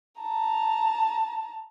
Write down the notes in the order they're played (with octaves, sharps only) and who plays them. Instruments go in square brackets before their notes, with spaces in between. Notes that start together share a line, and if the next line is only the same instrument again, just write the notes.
[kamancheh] A5 A#5